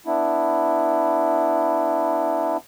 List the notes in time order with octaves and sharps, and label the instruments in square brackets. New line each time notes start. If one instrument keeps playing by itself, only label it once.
[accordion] B3 D4 E4